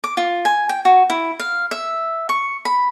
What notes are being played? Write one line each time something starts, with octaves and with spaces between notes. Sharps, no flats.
D6
F4
G#5
G5
F#4
E4
F5
E5
C#6
B5